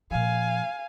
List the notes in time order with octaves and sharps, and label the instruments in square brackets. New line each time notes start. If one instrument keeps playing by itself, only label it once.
[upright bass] A#2 F3 [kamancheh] F5 G#5